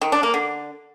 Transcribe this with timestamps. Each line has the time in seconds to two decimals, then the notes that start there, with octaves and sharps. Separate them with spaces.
0.01 D#3
0.12 D4
0.23 A#3
0.34 D3